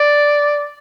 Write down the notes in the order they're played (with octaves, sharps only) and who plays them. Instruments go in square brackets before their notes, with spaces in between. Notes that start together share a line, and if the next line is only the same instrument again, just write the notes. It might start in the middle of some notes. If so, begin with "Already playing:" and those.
Already playing: [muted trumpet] D5